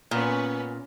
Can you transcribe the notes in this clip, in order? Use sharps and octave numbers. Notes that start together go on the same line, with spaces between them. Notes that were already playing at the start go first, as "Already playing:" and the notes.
A#2 B3 C#4